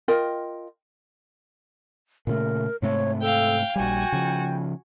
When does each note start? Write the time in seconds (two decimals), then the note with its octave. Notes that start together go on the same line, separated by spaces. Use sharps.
0.08 F4 A#4 D#5 G5
2.27 A#2 C#3 A3 A#4
2.82 G#2 C3 A3 C#5
3.21 A4 F5 G5
3.76 A#1 G3 F#4 G5 G#5
4.12 C#3 F3